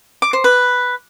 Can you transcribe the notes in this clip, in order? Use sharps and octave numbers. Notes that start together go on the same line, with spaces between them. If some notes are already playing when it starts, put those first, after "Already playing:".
D6
C5
B4